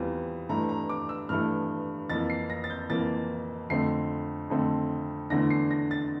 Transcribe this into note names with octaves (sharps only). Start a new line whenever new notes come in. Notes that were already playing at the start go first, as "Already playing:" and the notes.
Already playing: E2 E3 G3 C4 F4
G2 E3 A3 A#5
A#5
D6
E6
G2 E3 A3 F6
F2 E3 A#3 A6
C7
A#6
A6
G6
F2 E3 A#3 A6
F2 D3 A3 C4 C7
F2 D3 A3 C4
E2 D3 A3 D4 A#6
C7
A#6
A6